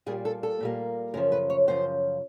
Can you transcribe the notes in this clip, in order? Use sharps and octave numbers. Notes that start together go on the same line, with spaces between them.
A#2 G3 A#3 G#4
A4
A4
A#2 G3 A#3
F#2 C#3 F3 A#4
B4
C#5
F#2 C#3 F3 C5